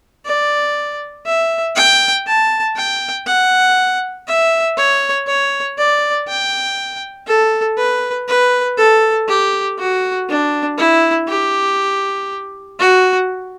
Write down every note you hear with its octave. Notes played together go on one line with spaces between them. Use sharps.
D5
E5
G5
A5
G5
F#5
E5
C#5
C#5
D5
G5
A4
B4
B4
A4
G4
F#4
D4
E4
G4
F#4